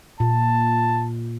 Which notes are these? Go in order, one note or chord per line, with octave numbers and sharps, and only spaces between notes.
A#2 A5